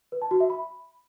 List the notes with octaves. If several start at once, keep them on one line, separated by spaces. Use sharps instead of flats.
B4
A5
F#4
E5
B5